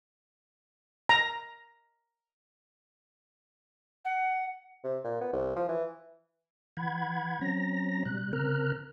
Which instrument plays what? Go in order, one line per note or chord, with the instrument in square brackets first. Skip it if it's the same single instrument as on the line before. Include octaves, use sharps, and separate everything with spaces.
[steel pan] A#5
[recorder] F#5
[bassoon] C3
A#2
B3
C2
F3
E3
[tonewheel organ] E3 F#5 B5 G#6
F#3 C4 C#4 A#5 A#6
B2 G3 F#6
C#3 C4 A#4 A#5 F6 F#6